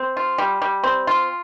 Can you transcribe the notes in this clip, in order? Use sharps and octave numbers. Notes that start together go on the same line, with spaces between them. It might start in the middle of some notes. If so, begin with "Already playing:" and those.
Already playing: C4
F4
G3
G3
C4
F4